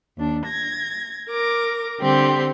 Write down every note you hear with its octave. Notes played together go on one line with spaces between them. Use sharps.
D#2 D4
G#6 A#6
A#4 D6 A#6
D3 G3 C4 G4